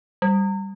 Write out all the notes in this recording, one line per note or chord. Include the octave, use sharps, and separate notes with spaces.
G3